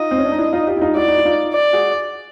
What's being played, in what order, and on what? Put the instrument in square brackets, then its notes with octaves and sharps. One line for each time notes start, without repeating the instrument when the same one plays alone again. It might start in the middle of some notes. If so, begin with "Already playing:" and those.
Already playing: [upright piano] D#4 F4 [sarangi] D#5
[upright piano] C4
C#4
D4
D#4
D4 E4
D#4 F4
F4 G4
E4
D#4 F4
[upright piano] E4 F#4 [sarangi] D5
[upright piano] D#4
E4
D#4 F4
[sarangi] D5
[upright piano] F#4 G#4